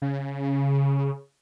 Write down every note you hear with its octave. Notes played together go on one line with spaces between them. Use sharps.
C#3